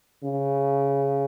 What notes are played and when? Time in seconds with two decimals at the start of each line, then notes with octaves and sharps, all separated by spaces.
0.24 C#3